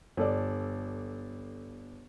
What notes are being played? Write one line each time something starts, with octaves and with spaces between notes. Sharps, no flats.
G1 A4 D5